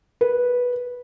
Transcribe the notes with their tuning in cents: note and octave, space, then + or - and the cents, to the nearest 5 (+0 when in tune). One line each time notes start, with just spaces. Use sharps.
B4 -10